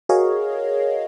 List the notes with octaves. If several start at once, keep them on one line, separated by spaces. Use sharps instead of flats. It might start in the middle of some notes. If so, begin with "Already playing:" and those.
F#4 G#4 A#4 C#5 D#5 F5